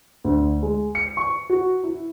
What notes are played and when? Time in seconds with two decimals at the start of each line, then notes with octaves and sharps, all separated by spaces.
0.24 D2
0.63 G#3
0.95 C#7
1.17 C#6
1.50 F#4
1.83 E4